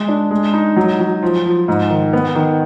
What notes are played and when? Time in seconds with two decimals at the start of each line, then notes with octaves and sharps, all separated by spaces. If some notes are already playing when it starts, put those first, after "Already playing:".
Already playing: G#3
0.08 D4
0.31 G#3
0.53 D#4
0.76 F#3
0.99 F#3
1.23 F3
1.46 F3
1.68 G#2
1.90 D#3
2.13 B3
2.35 D#3